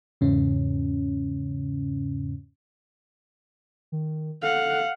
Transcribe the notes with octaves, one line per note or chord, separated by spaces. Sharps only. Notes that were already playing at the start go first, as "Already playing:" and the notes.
E2 G#2 C#3 C#4
D#3
A4 F5 F#5